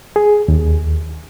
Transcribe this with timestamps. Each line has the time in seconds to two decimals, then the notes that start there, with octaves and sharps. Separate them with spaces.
0.16 G#4
0.48 D#2